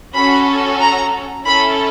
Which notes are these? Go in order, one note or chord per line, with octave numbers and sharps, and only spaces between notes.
C#4 F#4 A4 B5
A#5
C#4 E4 A4 B5